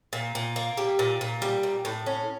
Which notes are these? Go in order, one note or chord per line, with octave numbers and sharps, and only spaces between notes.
A#2
A#2
A#3
G3
A#2
A#2
G3
A#2
A2
C#4